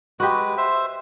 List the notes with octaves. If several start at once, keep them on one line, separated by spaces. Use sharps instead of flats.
G#3 F#4 G4 B4
C5 E5